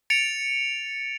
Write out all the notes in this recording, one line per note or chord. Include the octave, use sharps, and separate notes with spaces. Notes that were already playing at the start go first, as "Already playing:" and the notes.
A6 C#7 D7 F7